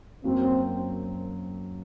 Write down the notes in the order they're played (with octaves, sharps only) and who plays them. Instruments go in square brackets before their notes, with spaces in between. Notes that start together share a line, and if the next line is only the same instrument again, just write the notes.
[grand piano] F#2 F#3 A#3 [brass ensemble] C4